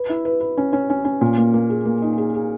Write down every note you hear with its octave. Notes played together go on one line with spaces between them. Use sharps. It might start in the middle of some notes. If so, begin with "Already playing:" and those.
Already playing: B4
E4
B4
B4
C#4
C#4
C#4
C#4
A#2
A#3
A#3
G#4
A#3
D#4
G#4
G#4